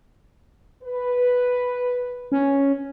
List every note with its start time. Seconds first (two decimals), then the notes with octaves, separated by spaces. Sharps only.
0.83 B4
2.32 C#4